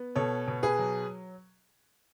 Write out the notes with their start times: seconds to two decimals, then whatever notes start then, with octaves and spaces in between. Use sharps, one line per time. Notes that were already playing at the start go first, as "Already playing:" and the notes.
Already playing: B3
0.15 B2 A4 C#5
0.48 B2
0.63 G#4 B4
0.79 F#3